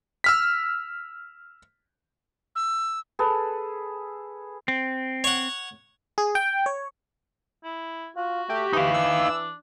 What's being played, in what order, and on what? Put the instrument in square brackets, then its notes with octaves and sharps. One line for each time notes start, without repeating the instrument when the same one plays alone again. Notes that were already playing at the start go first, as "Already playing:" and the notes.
[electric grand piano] E6 F6 B6
[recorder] E6
[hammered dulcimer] G#4 A4 B4
[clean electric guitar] C4
[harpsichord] C#5 F#5
[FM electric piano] G#4
G5
C#5
[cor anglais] E4
[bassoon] F4 [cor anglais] F#4
[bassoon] A3 [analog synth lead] G4
[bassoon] E3 [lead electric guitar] D#4 F5
[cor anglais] D4 [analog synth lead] E6